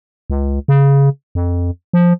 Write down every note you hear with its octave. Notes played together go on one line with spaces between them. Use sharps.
C#2
C#3
F2
F3